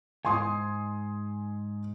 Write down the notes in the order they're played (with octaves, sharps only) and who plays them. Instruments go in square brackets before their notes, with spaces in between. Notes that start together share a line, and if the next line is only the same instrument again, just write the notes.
[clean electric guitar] D2 G#2 [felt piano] G#5 C6 D#6